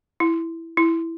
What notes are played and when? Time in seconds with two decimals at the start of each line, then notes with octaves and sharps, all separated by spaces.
0.20 E4
0.77 E4